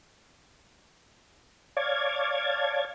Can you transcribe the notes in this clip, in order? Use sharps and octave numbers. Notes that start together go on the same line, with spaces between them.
C#5 D5 F5 A5 G#6